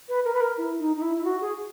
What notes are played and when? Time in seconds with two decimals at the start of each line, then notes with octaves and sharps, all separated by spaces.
0.09 B4
0.25 A#4
0.33 B4
0.41 A#4
0.58 E4
0.79 D#4
0.96 D#4
1.02 E4
1.17 E4
1.24 F#4
1.41 G#4